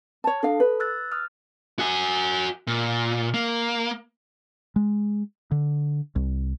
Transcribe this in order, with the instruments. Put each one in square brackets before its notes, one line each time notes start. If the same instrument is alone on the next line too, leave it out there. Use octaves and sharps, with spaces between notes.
[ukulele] C#5 A5
[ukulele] D4 F5 [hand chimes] A4
[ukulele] B4
[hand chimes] E6 F#6 A6
D#6 F6
[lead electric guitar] F#4 G#5
A#2
A#3
[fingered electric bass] G#3
D3
C2